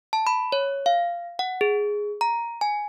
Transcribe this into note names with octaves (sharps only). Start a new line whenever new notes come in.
A5
B5
C#5
F5
F#5
G#4
A#5
G#5